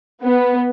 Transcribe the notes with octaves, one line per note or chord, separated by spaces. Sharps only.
B3